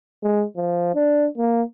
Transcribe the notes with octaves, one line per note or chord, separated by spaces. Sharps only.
G#3
F3
D4
A#3